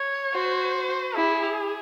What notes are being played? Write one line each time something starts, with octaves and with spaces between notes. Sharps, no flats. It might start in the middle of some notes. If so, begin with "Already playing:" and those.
Already playing: C#5
F#4 C5
E4 G#4